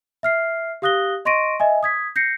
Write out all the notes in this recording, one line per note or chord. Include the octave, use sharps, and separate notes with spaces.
E5 F6 C7
G4 F5 D#6 F#6 A#6 G7
D#5 C6 C#6 A#6 D7 D#7
D#5 E5 G#5
D#6 G#6 B6
G6 A#6 C7 C#7